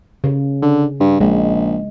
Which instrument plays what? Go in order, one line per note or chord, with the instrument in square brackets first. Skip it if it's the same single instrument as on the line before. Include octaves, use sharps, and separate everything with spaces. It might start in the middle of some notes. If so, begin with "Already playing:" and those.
[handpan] C#3
[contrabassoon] D3
G2
[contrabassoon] A#1 [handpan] G#3